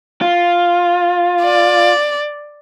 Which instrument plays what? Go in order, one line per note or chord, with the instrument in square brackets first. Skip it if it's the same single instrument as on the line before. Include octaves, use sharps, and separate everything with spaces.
[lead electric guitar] F4
[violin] D5